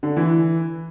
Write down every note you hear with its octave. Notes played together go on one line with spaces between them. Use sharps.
D3
E3